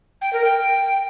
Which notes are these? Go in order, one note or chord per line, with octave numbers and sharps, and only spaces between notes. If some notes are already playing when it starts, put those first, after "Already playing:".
G5
A#4
G5